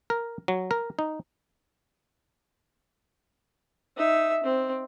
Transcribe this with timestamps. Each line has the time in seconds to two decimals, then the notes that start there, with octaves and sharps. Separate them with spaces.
0.10 A#4
0.48 F#3
0.71 A#4
0.99 D#4
3.96 D#4 E5
4.43 C4